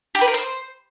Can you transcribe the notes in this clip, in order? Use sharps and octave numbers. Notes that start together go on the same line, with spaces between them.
G4
B4
A#4
C5